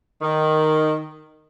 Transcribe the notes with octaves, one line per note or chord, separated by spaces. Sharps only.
D#3